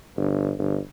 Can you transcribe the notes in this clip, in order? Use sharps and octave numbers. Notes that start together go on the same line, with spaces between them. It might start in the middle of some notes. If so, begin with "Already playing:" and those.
G1
G1